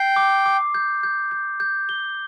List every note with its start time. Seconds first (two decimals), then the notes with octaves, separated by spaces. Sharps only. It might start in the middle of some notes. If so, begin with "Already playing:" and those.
Already playing: G5 C7
0.16 D6
0.46 D6
0.74 G6
1.03 G6
1.31 G6
1.60 G6
1.89 G7